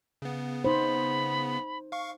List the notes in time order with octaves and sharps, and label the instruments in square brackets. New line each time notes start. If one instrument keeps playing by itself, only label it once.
[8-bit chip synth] C#3 B3
[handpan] D#4 C5 [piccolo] B5
[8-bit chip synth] F5 C#6